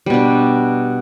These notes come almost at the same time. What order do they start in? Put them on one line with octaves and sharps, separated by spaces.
G3 B2 D4